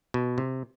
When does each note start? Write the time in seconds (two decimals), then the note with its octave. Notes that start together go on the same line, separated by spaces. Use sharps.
0.14 B2
0.38 C3